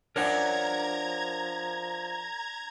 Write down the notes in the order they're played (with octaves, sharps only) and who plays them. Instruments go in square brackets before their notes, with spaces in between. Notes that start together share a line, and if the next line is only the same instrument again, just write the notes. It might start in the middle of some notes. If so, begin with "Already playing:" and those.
[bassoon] F3 [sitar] D4 [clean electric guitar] A#4 C#5 F#5 [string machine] A#5 G#6